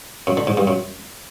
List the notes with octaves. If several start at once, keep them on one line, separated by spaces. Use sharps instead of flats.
F#2
D3
G#2
G2
F#2